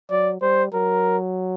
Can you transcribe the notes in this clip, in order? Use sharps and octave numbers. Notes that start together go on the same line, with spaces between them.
F#3 D5
G3 C5
F#3 A#4